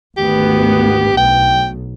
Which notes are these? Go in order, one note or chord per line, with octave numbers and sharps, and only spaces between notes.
G#1 D2 B3 G4
B1 G5